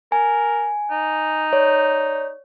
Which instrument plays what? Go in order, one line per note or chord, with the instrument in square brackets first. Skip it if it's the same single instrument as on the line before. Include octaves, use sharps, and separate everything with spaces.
[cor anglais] A#4 [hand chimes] G#5
[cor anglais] D#4
[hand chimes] C#5 D5